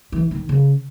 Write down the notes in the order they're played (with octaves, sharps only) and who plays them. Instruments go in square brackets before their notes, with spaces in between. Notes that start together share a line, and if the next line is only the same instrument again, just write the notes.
[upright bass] E3
D#3
C#3